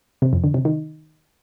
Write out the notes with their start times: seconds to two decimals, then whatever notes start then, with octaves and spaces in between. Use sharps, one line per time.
0.22 C3
0.33 F2
0.44 D3
0.54 C3
0.65 D#3